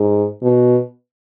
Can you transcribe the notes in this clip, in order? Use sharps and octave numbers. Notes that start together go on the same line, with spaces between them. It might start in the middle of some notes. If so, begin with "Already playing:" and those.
Already playing: G#2
B2